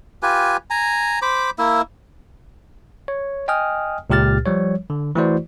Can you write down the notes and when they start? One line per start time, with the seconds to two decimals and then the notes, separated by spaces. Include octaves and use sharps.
0.23 F4 G4 B4 G#5
0.70 G#5 A#5
1.22 C5 B5 D6
1.58 A#3 E4 E5
3.08 C#5
3.48 D#5 G5 G#5 D#6 F6
4.10 C#2 A#2 G4 F6 A6
4.46 F3 G3 C#5
4.90 D3
5.15 E3 A3 E4 F#4 C5 D5